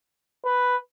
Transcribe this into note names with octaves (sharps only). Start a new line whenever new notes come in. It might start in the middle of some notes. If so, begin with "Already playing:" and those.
B4